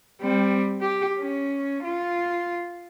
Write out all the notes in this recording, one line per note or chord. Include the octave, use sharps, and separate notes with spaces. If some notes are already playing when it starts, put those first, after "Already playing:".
G3 C4
G4
C#4
F4